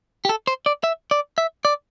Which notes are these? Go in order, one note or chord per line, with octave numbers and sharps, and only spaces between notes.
G4
A4
C5
D5
E5
D5
E5
D5